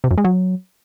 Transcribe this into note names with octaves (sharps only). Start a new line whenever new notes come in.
C3
F#2
G#3
F#3